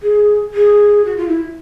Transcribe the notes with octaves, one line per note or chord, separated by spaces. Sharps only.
G#4
G#4
F#4
F4
E4